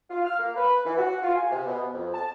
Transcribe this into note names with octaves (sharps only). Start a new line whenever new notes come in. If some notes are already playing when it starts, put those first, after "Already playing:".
F4
F6
A#3
B4
E3
F#4
F4
G#5
C3
B2
F2
A5